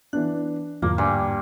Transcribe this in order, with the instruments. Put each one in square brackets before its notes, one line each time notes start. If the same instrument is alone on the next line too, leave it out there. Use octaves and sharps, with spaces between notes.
[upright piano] E3 B3 D4 [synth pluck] F#6
[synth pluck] E2 G#2 D3 [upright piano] F3 [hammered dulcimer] A#3
[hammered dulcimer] G2 [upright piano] G#5